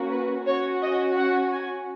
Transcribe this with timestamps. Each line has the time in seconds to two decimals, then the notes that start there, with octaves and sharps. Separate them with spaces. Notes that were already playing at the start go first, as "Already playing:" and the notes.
Already playing: A#3 C#4 F#4
0.11 B4
0.46 C#4 F#4 C#5
0.82 D#5
1.18 F#5
1.53 G#5